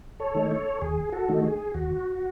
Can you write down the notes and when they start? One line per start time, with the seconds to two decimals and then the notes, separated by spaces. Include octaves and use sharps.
0.20 A4 C#5
0.35 D#3 A3 D#4
0.51 A4 C#5
0.82 D#2 G#4
1.12 F#4 A4
1.29 D#3 A3 D#4
1.44 G#4
1.74 D#2 F#4